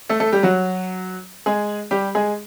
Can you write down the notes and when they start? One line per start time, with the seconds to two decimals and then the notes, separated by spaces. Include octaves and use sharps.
0.09 A3 A4
0.20 A3 A4
0.32 G3 G4
0.43 F#3 F#4
1.46 G#3 G#4
1.91 G3 G4
2.15 G#3 G#4